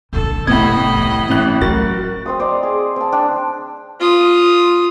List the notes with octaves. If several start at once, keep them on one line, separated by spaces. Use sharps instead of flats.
A#2 D3 A4
C2 A2 E3 B3 D#5 B5 G#6
D#3 E3
A1 A2 F#6
F#3 F#4 A#4 A6
C4 C5 D#6
C5 D5 D#5 A#5
G#4
C4 A5
D4 G5
F4 D#6